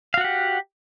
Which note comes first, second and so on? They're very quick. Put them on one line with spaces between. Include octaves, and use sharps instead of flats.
F5 F#4 F#5 G4